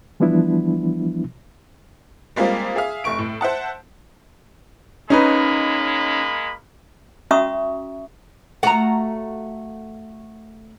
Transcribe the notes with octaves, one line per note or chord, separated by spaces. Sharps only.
E3 F3 G3 B3 D4 E4
G3 G#3 A#3 C4 F4
G#4 E5 F5
F1 A3 C#6 D7
A2
C5 E5 F#5 A5
G#3 A#3 C#4 D#4 B4 B5
C#4 F#4 E5 A#5 C#6 D#6
A3 F4 F#4 F#5 A#5